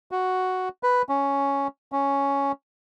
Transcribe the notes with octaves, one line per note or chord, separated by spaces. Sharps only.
F#4
B4
C#4
C#4